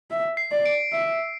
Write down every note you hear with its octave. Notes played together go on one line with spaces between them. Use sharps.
E5
C7
D5
D7
E5